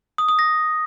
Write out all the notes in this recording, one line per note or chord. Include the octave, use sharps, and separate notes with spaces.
D#6
D#6
A#6